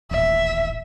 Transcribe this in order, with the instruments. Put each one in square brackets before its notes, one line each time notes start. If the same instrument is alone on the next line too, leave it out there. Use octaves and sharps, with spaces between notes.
[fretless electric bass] D#1 A1 [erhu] E5